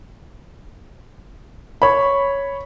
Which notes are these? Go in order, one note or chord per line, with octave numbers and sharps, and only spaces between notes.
C#5 B5